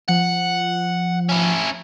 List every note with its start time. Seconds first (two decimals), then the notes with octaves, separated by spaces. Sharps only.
0.09 F3 F#5
1.29 C#4 E4